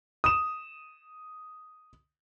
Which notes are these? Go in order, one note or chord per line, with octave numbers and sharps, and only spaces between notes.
D#6 E7